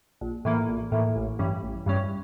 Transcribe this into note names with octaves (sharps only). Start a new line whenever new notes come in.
A#1
A2 E3 A#3
A#1
A2 E3 A#3
A1
G2 E3 G3 C#4
A1
G2 E3 G3 C#4